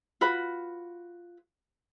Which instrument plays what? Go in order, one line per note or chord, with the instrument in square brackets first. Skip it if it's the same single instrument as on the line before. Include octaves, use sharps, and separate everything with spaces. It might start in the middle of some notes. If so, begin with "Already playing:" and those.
[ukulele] F4 F#4 B4 B5